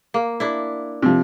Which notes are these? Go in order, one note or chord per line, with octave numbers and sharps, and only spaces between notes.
A#3
D4 E4
C3 F3